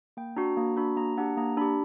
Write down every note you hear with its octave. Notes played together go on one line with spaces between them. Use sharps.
A#3 G5
D4 F#4 A#5
A#3 A#5
D4 F#4 B5
A#3 A#5
D4 G4 F#5
A#3 A#5
D4 G4 B5